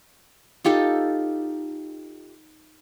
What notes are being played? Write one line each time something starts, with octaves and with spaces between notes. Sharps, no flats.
D#4 F4 G4 A4